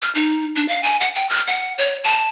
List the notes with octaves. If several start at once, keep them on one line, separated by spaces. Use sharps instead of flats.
F6
D#4
D4
F5
G#5
F#5
G5
F6
F#5
C#5
A5